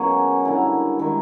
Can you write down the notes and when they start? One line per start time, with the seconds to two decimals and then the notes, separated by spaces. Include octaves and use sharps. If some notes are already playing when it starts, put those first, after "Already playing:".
Already playing: B2 F#3 A#3 C#4 G#4
0.45 D3 G3 A#3 E4
0.99 D#3 G#3